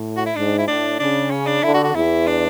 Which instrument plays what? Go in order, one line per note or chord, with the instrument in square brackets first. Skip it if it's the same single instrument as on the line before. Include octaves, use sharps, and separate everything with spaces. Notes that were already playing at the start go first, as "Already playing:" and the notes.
Already playing: [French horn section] A2
[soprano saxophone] F#4
E4
[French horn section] G#2 [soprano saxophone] D4
[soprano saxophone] E4
[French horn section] A2 [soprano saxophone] D4
[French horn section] C#3 [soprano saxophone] D4
[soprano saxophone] C#4
D4
[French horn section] D3 [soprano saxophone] E4
[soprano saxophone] F#4
F#4
[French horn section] E2 [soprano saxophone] E4
[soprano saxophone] D4